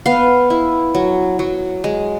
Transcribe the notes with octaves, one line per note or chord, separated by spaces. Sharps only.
B3 F5
E4
F#3
F#3
G#3